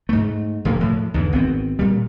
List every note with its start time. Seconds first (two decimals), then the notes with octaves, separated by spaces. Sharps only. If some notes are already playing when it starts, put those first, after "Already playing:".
0.09 G#2 A3
0.65 E1 F3 A3 A#3
0.81 A2 F3
1.14 E2 G#2 D3
1.33 G#1 B3 C4
1.79 A#2 G3